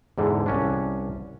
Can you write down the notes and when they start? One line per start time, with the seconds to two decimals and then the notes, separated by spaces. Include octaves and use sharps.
0.18 E2 G#2 D3
0.46 C2 C#4 D4